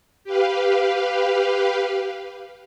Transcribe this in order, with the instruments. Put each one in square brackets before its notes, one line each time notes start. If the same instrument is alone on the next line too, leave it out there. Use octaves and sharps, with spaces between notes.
[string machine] G4 B4 F5